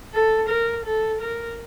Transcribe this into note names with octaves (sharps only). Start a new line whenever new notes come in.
A4
A#4
A4
A#4